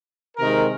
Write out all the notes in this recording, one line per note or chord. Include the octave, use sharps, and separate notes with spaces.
C3 D#3 G#3 A#4